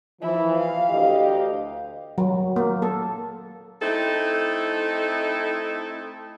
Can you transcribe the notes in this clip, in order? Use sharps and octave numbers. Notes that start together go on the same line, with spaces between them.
E3 F3 E4
F5
D2 G4 D#5
F#3
A#3
A4
A3 C4 D#4 E4 A4